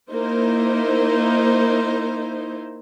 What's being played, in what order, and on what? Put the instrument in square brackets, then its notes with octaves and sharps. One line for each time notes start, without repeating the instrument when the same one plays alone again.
[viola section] A#3 D#4 E4 C5